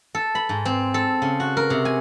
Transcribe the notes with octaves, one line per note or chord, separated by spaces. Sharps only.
A4
B5
G#2
C4
A4
C#3
F#4
A#4
C3
G#5